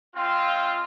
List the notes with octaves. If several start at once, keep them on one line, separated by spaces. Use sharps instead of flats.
G#3 C4 F4